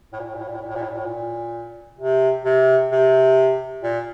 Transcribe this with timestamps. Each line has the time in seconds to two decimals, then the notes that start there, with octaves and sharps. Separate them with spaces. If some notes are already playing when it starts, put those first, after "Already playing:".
0.13 A2
0.20 A#2
0.27 A2
0.34 A#2
0.40 A2
0.48 A#2
0.55 A2
0.62 A#2
0.69 A2
0.75 A#2
0.83 A2
0.89 A#2
0.97 A2
1.05 A#2
1.98 C3
2.44 C3
2.91 C3
3.83 A#2